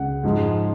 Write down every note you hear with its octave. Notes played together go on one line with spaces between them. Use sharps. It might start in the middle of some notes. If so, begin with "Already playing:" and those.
Already playing: C#2 C#3 F#5
G#2 F3 G#3